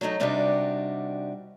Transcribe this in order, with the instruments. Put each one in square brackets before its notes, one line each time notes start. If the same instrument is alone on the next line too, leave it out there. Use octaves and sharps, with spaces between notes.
[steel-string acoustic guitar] F#3 A3 C#4 D#4 F#4
C3 G3 D4 D#4 F#4 G4